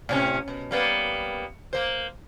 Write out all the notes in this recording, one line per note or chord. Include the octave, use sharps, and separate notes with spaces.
A2 C3 C#4
B2
G3 A#3 B3
A#3 C5